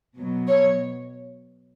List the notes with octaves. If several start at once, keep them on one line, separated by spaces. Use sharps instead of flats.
B2 F#3
C#5